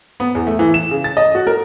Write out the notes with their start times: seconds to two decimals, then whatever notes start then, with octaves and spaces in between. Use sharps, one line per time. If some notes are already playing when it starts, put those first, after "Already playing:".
0.20 B3
0.35 E2
0.47 A3
0.59 E3
0.74 E7
0.91 C#3
1.04 A6
1.17 D#5
1.35 F#4
1.47 A#4